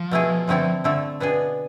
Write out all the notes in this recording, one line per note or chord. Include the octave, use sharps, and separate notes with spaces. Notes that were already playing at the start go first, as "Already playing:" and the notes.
Already playing: F3
B2 A3 E4 G#4
D3 A3 C4 E4 A4
D3 A3 E4 A4
B2 B3 D4 G#4